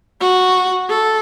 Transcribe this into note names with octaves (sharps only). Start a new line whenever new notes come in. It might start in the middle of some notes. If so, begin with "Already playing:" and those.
F#4
A4